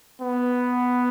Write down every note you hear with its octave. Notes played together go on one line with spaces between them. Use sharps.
B3